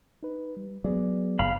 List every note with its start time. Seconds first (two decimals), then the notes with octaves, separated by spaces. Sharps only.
0.23 D#4 B4
0.57 G3
0.84 F#3 B3 G#4 D5
1.39 F#1 G2 A#2 F5 B5